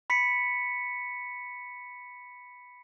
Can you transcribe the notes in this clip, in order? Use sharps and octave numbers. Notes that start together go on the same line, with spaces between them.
B5 B6 C#7